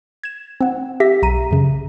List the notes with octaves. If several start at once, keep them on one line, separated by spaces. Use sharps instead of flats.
G#6 E7
C4 F#5
G4 E5 A#6 B6
B1 A#5 D#7
F#2 C#3